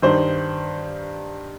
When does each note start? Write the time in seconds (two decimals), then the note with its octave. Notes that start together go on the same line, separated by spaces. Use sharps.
0.02 G2 D#3 C5